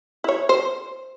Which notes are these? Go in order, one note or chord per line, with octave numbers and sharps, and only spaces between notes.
E4 C#5
C5